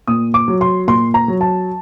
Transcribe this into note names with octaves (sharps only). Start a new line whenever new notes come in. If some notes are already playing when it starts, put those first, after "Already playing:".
A#2 D#6
D6
F#3
C6
A#2 C6
A#5
F#3
A5